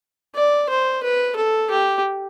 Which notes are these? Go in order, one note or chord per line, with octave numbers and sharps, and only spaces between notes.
D5
C5
B4
A4
G4